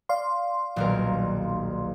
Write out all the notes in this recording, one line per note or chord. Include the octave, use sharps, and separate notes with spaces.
D5 F5 C6
D#1 B1 A#4